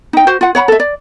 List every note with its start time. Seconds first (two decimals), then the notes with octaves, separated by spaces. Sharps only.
0.13 D#4 G5
0.27 F#4 C5
0.41 F4 F#5
0.55 C#5 F#5 B5
0.68 A4 E5
0.80 D5